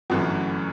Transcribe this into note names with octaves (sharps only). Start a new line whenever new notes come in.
G1 F#2 E3 A3 F#4